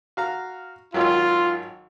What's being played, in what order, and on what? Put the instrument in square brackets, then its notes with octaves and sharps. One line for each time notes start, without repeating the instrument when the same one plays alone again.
[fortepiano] F#4 F5 A#5
[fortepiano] G#1 D#3 F#3 [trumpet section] F4